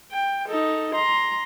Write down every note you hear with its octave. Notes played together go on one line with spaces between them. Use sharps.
G5
D#4 A4
A#5 C6